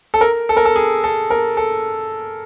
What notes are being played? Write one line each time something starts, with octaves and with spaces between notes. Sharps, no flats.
A4
A#4
A4
A#4
A4
G#4
A4
A#4
A4